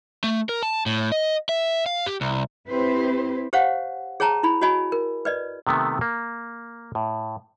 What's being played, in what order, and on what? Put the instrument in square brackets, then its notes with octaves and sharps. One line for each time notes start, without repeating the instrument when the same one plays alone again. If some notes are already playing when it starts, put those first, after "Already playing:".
[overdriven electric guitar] A3
A#4
A5
A2
D#5
E5
F5
G4
C2
[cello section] C4 E4 G4 B4 C5
[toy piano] G4 C5 C#5 F5 F#5
G#4 C#5 G5 A5 A#5
E4 B5
F#4 C#5 D#5 G#5 B5
A#4
B4 D5 D#5
[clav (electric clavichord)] C3 D#3 A3 B3
A#3
A2